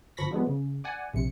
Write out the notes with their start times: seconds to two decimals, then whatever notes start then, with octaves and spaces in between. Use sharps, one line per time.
0.17 G1 F3 B5 C#6 A#6 B6
0.31 F3 G3 G#3 B3
0.47 C#3
0.84 D5 F#5 G#5
1.14 A#1 C3 C#7